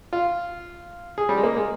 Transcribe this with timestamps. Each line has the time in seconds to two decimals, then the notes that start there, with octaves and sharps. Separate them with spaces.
0.13 F4
1.18 G#4
1.29 G3
1.37 G#3
1.43 A#3
1.57 G#3